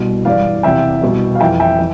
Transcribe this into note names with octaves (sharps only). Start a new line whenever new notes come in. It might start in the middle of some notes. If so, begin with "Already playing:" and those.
Already playing: C2 B2
G2 E3 D5 F5
E2 C3 E3 E5 G5
C2 B2
F5
F2 E3 E5 G5
E5 G5
E3